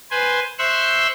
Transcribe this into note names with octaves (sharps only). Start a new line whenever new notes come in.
B4 C5 G#5
C5 E5 C6 C#6 E6 F#6